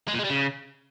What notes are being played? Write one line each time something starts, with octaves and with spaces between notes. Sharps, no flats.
G#3
A#2
G#3
G3
C#3